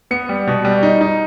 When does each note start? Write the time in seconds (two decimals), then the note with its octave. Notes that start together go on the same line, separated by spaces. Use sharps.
0.11 B3 C#7
0.29 G3
0.47 B2
0.65 G3
0.83 D#4
1.01 D#4